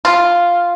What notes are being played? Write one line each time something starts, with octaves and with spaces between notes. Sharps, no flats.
F4